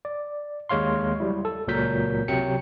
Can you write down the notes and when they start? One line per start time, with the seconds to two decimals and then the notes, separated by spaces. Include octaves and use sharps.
0.05 D5
0.69 D#2 G#3 C#5 F5 C6
1.20 F#3 G3 E4
1.45 A4
1.67 C#2 A#2 F#3 A#4 G6 B6
2.28 C3 F#3 G5 C#7